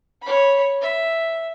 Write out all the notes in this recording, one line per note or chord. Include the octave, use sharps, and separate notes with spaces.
C#5 B5
E5